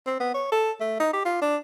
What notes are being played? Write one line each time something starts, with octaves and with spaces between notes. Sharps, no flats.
C4
B3
C#5
A4
A3
D#4
G4
F4
D4